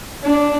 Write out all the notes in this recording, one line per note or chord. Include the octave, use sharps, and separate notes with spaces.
D4